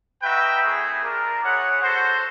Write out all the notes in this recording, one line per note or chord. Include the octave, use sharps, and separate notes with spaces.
D#4 F#4 B4 E5 G5
A3 C4 E4 G#4
D4 F4 A#4
E4 G#4 C#5 F#5
F#4 A4 C5